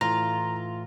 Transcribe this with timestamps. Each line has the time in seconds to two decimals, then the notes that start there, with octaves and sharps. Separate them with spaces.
0.01 A2 E3 A3 F4 A#5